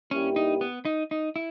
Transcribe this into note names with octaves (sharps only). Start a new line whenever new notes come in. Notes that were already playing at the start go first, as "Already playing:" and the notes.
G2 G3 A#3 C#4 E4 G4
D#4
B3
D#4
D#4
E4